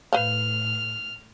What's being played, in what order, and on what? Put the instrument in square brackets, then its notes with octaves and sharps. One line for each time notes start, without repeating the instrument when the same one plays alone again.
[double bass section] A2 [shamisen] B4 C5 F5 [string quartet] F6